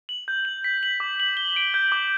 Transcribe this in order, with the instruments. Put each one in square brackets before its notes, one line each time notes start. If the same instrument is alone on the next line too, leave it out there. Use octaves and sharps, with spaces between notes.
[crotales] F#7
G6
F#7
B6
F#7
D6
F#7
G7
D7
G6
D6